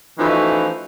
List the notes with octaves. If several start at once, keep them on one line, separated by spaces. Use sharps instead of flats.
E3 F3 A3 C#4 D#4 F#4